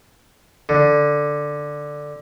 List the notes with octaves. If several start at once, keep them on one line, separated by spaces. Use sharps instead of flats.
D3